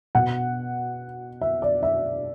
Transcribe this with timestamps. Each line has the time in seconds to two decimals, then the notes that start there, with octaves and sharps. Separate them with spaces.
0.15 B2 F#5
1.41 E5
1.62 D5
1.83 E5